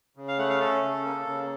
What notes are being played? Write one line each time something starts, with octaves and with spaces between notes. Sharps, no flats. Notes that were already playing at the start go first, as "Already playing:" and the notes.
C#3
F5
A3 F#5
F5
C#4 A4
C#3
A#3
C#3